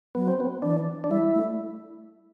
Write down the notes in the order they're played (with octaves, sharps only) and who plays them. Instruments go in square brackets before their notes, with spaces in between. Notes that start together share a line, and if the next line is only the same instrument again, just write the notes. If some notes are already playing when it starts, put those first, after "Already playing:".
[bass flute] F#3 [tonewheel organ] B3
[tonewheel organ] C4
B3
[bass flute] E3 [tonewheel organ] D4
[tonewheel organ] D4
[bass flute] G3 [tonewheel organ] E4
[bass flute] A3